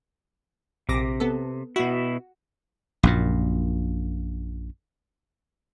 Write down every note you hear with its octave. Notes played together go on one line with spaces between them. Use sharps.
A#1 C3 D6 A#6
B3 A4
B2 E4 F#4
A#1 F#2 A#2